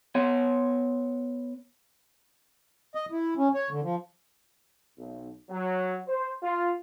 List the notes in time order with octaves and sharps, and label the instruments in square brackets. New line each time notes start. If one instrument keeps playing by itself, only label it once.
[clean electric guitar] B3 C#5 F#5
[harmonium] D#5
E4
C#4
C#5
D3
F3
[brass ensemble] B1
F#3
C5
F4